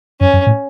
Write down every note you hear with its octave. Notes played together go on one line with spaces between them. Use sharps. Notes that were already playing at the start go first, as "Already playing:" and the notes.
F#2 C#4
F#2
A2